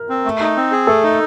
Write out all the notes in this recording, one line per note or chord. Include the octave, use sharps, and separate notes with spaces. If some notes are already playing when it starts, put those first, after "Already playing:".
Already playing: A#4
C4
A3
D#4
C4
G#4
A3 A4
D#4